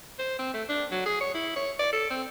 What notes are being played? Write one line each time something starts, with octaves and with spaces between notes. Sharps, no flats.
C5
C4
A3
D4
F#3
G#4
C#5
E4
C#5
D5
A4
C4